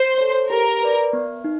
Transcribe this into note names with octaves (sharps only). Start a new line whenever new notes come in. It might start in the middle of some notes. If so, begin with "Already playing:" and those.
Already playing: C5
A4 C#5
G4 A#4
B4 D5
B3
D#4